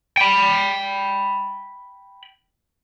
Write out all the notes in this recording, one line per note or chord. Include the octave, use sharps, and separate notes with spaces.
G5 B5